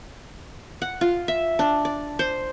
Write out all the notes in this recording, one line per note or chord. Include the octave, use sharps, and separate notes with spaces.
F#5
F4
E5
D4
D5
C5